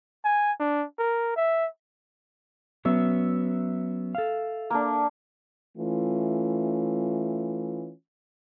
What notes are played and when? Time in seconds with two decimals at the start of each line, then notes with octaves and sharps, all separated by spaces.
0.25 G#5
0.60 D4
0.99 A#4
1.36 E5
2.85 F#3 B3 C#4 E5
4.15 A4 F5
4.70 A#3 D4
5.78 E3 A3 C#4 F4